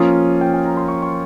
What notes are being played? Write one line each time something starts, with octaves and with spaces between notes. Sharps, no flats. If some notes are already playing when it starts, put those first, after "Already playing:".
Already playing: F3 A#3 C#4 F4 D#6
G5
G#5
A#5
C6
C#6
C#6